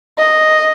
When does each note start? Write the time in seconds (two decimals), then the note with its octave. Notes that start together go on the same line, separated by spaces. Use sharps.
0.19 D#5